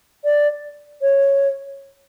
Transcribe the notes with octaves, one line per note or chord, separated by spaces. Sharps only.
D5
C#5